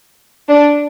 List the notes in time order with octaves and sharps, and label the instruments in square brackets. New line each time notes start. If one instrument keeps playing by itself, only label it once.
[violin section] D4